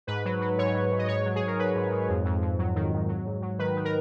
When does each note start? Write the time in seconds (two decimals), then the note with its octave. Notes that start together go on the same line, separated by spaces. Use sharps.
0.07 G#2 B4
0.25 F#3
0.41 F#3
0.58 G#2 C#5
0.74 F#3
0.91 G#2
0.98 D#5
1.08 G#2 C#5
1.25 F#3
1.35 G#4
1.42 G#2
1.47 A#4
1.59 F#3 B4
1.75 G#2
1.91 G#2
2.09 F2
2.25 F2
2.42 F2
2.59 F#3
2.75 D#3
2.93 F2
3.08 F#3
3.26 G#2
3.42 F#3
3.59 D#3 B4
3.76 D#3
3.85 A#4